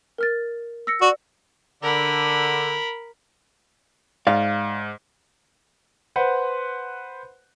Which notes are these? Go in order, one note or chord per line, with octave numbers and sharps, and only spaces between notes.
A#4 F6 A6
E6 A#6 C#7
F#4 D5
D3 A#4 B5
G#2 D5 F5
B4 C5 F#5